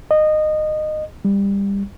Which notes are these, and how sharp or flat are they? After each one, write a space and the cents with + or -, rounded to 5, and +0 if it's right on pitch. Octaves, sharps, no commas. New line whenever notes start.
D#5 -20
G3 +20